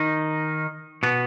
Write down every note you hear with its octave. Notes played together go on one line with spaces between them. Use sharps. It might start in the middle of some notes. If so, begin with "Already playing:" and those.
Already playing: D#3 D#4
B2 B3